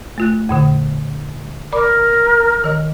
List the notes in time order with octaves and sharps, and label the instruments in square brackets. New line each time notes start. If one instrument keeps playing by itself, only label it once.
[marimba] A3 F4 F#6
F2 A#2 D3
[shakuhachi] A#4 [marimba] D5 B5 D6
[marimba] D#3 D#5